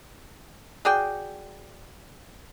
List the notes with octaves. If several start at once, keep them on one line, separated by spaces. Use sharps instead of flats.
F#4 G#4 D5 G5